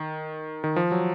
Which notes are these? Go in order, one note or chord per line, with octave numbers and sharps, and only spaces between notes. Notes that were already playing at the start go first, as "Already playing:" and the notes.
Already playing: D#3
D#3
F3
F#3